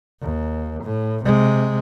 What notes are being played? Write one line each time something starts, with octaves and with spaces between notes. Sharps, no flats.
D#2
A2
C3 G#3